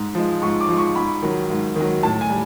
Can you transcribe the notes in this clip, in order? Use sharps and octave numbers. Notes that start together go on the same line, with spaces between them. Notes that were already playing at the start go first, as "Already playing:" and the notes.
Already playing: G#2
F3 G#3
G#2 C#6
D6
F3 G#3
C#6
G#2 B5
D#3 F#3
G#2
D#3 F#3
A2 A5
G#5
G3